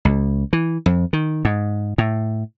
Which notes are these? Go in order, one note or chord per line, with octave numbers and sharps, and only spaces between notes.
C#2
E3
F2
D#3
G#2
A2